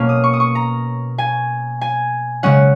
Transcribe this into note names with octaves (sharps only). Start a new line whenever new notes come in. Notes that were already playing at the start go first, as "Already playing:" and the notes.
Already playing: B2 A#3 C#4 F6
D#6
C#6
D#6
C#6
A#5
G#5
G#5
C#3 G#3 C#4 F#5